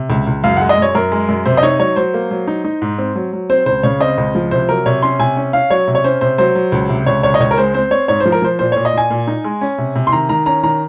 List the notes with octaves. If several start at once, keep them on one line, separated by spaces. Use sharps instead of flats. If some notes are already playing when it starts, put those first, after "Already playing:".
Already playing: C3
C#2
C#2
F#2 F5
G#3 F#5
D#5
F#2 C#5
F#2 A#4
G#3
F#2
C3 C5
D#5
D#4 C#5
F#3 C#5
F#3 C5
A#3
F#3
D#4
D#4
G#2
C4
F#3
F#3
C4 C5
C#2 C5
C#3 C#5
C4 D#5
C#2
F3
C3 C5
F#3 A#4
C3 C#5
C#4 C6
C3 G#5
C#4
C#4 F5
F#3 C#5
C3
C#5
C#4 C5
C3 C5
F#3 C5
F#3
C#2
C3
C#2 C#5
C#2 C#5
D#5
C#2 C#5
A#4
G#3 C5
C4 C5
C4 C#5
G#2 C#5
C5
F3
A#4
F3 C5
A#2 C5
A#2 C#5
D#5
A#2 G#5
A#2
D#4
G#3
C#4
C3
C3
C6
D#3 A#5
D#3 A#5
C#4 A#5
D#3 A#5